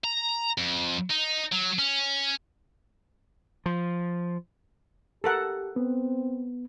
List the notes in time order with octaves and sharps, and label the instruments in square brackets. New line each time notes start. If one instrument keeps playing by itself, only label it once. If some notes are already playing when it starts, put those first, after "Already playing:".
[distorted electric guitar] A#5
F2
D#4
F#3
C#4
[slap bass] F3
[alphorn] G4 [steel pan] A4 A#4 F#5
[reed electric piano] B3 [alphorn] C4